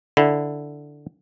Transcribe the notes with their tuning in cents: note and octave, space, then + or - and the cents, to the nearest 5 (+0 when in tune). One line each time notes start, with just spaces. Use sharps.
D3 +0 E4 +0